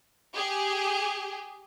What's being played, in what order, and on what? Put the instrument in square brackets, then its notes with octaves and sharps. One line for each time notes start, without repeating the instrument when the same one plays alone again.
[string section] G4 G#4